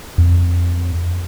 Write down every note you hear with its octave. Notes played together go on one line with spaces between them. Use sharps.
F2